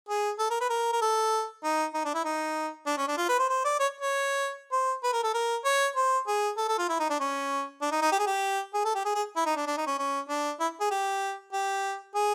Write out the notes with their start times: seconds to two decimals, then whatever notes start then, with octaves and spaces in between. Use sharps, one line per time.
0.09 G#4
0.39 A4
0.50 A#4
0.61 B4
0.70 A#4
0.93 A#4
1.02 A4
1.64 D#4
1.94 D#4
2.05 D4
2.14 E4
2.24 D#4
2.86 D4
2.97 C#4
3.07 D4
3.17 F4
3.29 B4
3.39 C5
3.49 C5
3.65 D5
3.80 C#5
4.01 C#5
4.72 C5
5.03 B4
5.13 A#4
5.23 A4
5.34 A#4
5.65 C#5
5.96 C5
6.27 G#4
6.57 A4
6.69 A4
6.78 F4
6.89 E4
7.00 D#4
7.10 D4
7.20 C#4
7.81 D4
7.91 D#4
8.02 D#4
8.12 G4
8.19 G#4
8.26 G4
8.74 G#4
8.85 A4
8.95 G4
9.05 G#4
9.15 G#4
9.36 E4
9.46 D#4
9.56 D4
9.67 D4
9.77 D#4
9.87 C#4
9.99 C#4
10.29 D4
10.60 E4
10.80 G#4
10.91 G4
11.53 G4
12.15 G#4